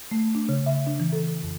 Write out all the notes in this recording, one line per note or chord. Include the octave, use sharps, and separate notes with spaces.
A3
D4
C#3
E5
D4
E3
A4
F2